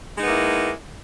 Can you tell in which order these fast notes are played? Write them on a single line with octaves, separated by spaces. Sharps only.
G#3 D#4 B3 A#3 E4